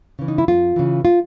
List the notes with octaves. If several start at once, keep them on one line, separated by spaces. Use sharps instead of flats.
C#3 E3
D#4
E4
F2 F4
C#3 E3
F4